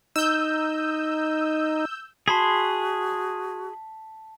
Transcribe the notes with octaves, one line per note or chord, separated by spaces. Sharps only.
D#4 E6 G6
F#4 G#4 A5 B5 C6 B6